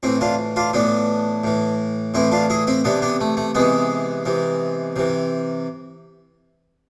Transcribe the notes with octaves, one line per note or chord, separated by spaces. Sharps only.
A2 E3 C4 E4
D4 F4
D4 F4
A2 E3 B3 D4
A2 E3
A2 E3 C4 E4
D4 F4
E4 G#4
C4 E4
C3 E3 B3 D4
B3 D4
A3
A3
C3 E3 G#3 B3
C3 E3
C3 E3